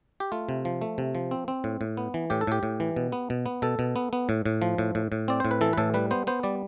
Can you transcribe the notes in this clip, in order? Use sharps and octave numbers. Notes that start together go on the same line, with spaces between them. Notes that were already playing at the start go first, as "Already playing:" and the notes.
G4
A3 F4
C3
F3
A3
C3
F3
C4
C4
A2
A2
B3
E3
A2 G4
A4
A2 G4
A2
E3
B2
B3
B2
B3
B2 A4
B2
B3
B3
A2
A2
F3
A2
A2
A2
C4 D5
A2 C5
B4
E3 A4
B4
A2 A4
G3 B4
B3 C5
B3 C5
G3 D5